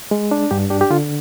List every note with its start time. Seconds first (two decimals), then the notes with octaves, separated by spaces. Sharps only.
0.11 G#3
0.31 D4
0.51 G2 G4
0.70 D4 G4
0.81 G4
0.90 D3 F4